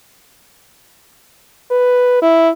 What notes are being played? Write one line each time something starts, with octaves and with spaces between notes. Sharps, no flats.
B4
E4